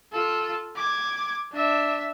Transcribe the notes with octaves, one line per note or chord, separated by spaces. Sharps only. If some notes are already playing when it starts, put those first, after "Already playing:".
F4 A4
D6 G#6
D4 E5